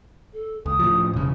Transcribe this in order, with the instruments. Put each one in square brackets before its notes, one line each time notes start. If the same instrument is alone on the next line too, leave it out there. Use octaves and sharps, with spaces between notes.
[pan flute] A4
[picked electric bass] C#2 [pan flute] D#6
[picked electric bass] A2 F3
E1 C#3